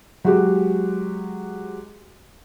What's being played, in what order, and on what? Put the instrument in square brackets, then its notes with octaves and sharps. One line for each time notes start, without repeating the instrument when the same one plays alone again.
[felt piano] F#3 G#3 F#4 G4